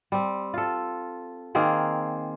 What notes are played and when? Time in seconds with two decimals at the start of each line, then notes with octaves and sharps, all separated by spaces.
0.12 G3 C4
0.54 F4 A4
1.55 D#3 A#3 C4 G#4